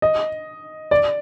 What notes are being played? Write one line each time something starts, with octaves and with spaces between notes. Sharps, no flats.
D#5
D5